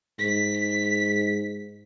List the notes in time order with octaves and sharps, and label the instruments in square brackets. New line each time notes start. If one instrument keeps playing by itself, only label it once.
[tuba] G#2 [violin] B6